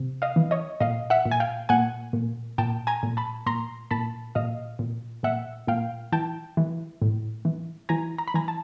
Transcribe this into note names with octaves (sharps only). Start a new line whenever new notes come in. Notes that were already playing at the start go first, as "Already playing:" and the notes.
Already playing: C3
D#5 F5
E3
C#5 D#5
A#2 D#5 F5
E5 F#5
A#2
G#5
F5 G5
A#2 F#5 G#5
A#2
A#2 G5 A5
G#5 A#5
A#2
A5 B5
A#2 A#5 C6
A#2 A5 B5
A#2 D#5 F5
A#2
A#2 E5 F#5
A#2 F5 G5
E3 G5 A5
E3
A2
E3
E3 G#5 A#5
A#5
B5
E3 G#5 A#5
A5